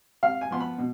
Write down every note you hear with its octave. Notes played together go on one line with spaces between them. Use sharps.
C3 F5
G#5
F3 B3 C6
B5
B2